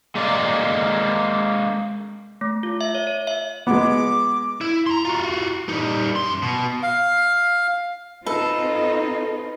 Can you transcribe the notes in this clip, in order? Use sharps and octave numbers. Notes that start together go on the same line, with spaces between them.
G#3 A#3 D5
A3
F4
E5
C#5
C#5
E5
G#3 B3 D6
E4
A#5 C6
F4 F#4
G3 D#4
F#2 C6
B2
F5
C4 D#4 F4 A4 B4